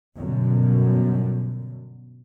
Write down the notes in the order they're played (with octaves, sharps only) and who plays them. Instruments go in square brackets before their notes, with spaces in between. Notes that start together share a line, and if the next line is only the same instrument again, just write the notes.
[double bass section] G1 F#2 B2 D3